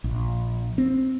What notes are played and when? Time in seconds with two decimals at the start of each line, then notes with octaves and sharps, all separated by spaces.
0.04 A#1
0.78 C4